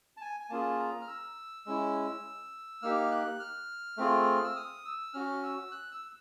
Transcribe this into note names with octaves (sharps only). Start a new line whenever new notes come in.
A5
G#5
G#5
A#3 C#4 F4 G#4 A5
A#5
F6
E6
G#3 C#4 E4
A#3 D#4 G4 F6
F#6
F6
A3 C4 F4 G#4
E6
D#6
E6
C#4 F#4 F6
E6
F#6
E6